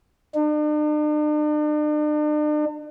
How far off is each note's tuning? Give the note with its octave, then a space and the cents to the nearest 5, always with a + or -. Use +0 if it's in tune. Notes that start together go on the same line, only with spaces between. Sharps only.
D4 +45